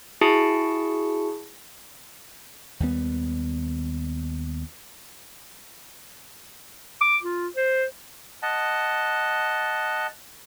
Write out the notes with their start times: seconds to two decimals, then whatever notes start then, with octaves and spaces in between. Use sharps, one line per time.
0.21 E4 F#4 G#4 A5 C#7
2.80 D#2 G3 B3
7.01 D6
7.23 F4
7.56 C5
8.43 D#5 F#5 A5